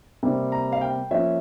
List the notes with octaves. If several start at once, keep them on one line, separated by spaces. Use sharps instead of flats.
C3 G3 A#3
A#5
F5
G5
F3 A#3 C#4 E5